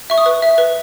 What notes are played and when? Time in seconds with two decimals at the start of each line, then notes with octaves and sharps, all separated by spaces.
0.10 E5 C#6
0.18 D#6
0.26 B4
0.42 E5
0.58 B4